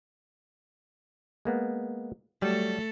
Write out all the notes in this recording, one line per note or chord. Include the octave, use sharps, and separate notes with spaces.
G#3 A#3 B3
F#3 G3 A3 A4